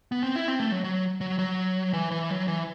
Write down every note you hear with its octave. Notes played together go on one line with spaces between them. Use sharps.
B3
C4
E4
C4
A3
F#3
F#3
F#3
F#3
E3
E3
F#3
E3